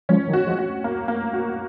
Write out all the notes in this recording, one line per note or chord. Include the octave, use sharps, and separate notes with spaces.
F3 G#3 C#4
D#3 F#3
F#4
F3 G#3
F#4
A#3
A#3
F#4